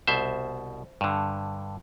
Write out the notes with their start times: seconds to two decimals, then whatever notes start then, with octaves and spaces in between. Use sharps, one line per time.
0.07 C2 B2 C5 E5
1.01 G2 D3